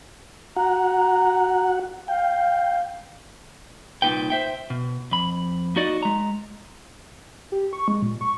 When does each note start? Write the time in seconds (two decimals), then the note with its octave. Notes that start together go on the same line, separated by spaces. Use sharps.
0.57 F#4 F#5 A#5
2.08 F5 G5
4.02 C2 A#2 A#3 D#4 B4 G5
4.30 C5 E5 G5
4.70 B2
5.11 F2 B5
5.76 A#3 D#4 F#4 D5 D#5
6.03 G#3 A#5
7.52 G4
7.73 C#6
7.88 G#3
8.02 A#2
8.21 C#6